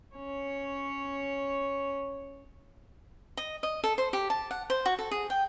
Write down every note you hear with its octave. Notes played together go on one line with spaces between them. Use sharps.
C#4 C#5
D#5
D#5
A4
C5
G4
A5
F#5
C5
F#4
A4
G#4
G5